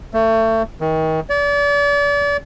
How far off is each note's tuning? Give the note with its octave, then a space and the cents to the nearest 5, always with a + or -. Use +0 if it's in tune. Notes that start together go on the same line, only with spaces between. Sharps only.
A3 +30
D#3 +35
D5 -35